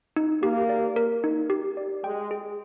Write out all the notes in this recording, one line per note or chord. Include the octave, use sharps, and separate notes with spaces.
D#4
A#3 G4
D5
A#4
D#4
G4
D5
G#3 G5
G#4